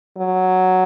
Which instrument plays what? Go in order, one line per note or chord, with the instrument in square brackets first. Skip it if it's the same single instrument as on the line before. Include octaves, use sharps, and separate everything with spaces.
[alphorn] F#3